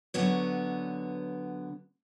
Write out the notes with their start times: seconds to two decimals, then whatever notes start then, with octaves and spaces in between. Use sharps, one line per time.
0.14 D3 F#3 B3 C#5